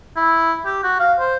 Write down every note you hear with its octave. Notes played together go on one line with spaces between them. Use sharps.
E4
G4
F#4
F5
C5